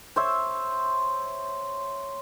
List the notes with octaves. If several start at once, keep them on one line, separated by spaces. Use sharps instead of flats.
C5 C#5 E5